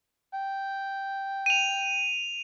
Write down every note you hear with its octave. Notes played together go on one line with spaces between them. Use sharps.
G5
D#7 F7